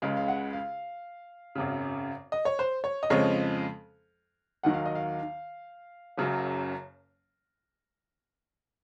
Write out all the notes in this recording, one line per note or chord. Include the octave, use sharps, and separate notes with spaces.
C#2 C#3 G#3 F5
F5
F#5
F5
G#1 F#2 C#3
D#5
C#5
C5
C#5
D#5
F2 C#3 F3 G#3 C#5
D#2 D#3 F#3 F#5
F5
D#5
F5
F#1 F#2 C#3 F#3